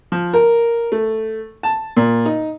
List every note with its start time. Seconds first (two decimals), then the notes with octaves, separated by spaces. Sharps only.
0.12 F3
0.34 A#4
0.92 A3
1.63 A5
1.97 A#2
2.25 D#4